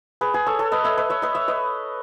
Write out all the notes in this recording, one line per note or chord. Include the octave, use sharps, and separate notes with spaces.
G#4 B4
G#4 B4
A4 C#5
A4 C#5
B4 D#5
C#5 E5
B4 D#5
C#5 E5
B4 D#5
C#5 E5
B4 D#5